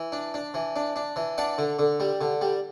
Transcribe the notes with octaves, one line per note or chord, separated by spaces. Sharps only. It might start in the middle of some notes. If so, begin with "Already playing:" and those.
Already playing: E3
D4
D4
E3
D4
D4
E3
D4 D5 F#5
D3
D3
G3
D3
G3